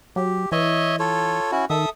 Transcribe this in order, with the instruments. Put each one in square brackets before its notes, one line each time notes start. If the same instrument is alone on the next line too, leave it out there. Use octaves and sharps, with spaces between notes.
[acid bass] F#3 [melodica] G4
[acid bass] E3 [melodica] C#5 D#5 E5
[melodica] F4 A4 C#5
C#4 E4 F#4
[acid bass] D#3 [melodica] A4 E5 D#6